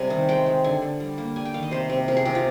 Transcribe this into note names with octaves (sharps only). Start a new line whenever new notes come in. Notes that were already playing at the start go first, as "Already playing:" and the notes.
Already playing: C3 G3 G#5
D#3
G#3 G5
G#3
D3 G#5
D3
G3
A#3
G3 G#5
G5
D#3 F5
D#5
C3 C5
C3
C3 A#4
G#4
C3 G4
F4